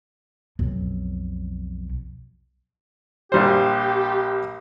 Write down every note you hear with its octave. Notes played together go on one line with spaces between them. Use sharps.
B1 F2
A#1 G3 G4 C5